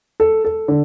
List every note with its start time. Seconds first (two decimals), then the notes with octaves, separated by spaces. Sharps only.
0.20 A4
0.45 A4
0.68 D3